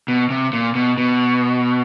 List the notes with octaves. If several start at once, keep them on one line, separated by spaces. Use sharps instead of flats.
B2
C3
A#2
B2
B2